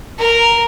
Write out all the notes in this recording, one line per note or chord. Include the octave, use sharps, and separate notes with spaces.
A#4